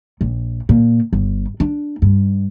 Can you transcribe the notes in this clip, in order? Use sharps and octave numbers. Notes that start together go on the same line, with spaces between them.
A#1
A#2
G1
D4
G2